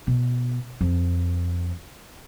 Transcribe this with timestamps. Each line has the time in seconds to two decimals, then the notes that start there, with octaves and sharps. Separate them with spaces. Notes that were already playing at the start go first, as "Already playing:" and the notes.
0.07 B2
0.81 F2